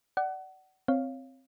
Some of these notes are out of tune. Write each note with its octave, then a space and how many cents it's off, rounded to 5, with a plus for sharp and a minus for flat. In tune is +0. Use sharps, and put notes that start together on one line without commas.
D5 +10 F#5 +25
C4 +0 C#5 +0 F5 +0